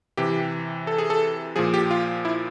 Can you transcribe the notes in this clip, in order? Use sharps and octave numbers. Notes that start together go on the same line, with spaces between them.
C3 E3 G4
A4
G#4
A4
A#2 F3 G#4
G4
F4
E4